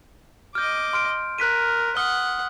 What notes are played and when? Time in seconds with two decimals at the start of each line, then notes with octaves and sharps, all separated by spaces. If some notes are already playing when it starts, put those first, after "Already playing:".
0.55 D#5 D6 F6 G6
0.93 C6 F6 D7
1.38 A#4 F#6 B6 D#7
1.97 F#5 D#6 F6 G7